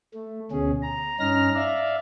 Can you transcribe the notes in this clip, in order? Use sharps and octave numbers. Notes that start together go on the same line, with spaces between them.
A3
D2 B2 C#4 G#4
A#5
G2 C#4 D#4 A#5 F6 A#6
D5 E5 F5